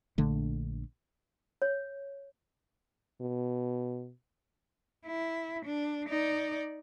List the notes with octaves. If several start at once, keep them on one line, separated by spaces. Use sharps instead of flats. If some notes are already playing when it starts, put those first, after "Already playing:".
A#1 D3 A3
C#5
B2
E4
D4
D#4 D5